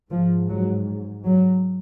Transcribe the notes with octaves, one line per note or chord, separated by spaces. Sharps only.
G#2 F3
F#3
F#3